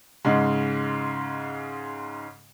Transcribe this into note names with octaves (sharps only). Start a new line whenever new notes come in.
G#2 C#3 G#3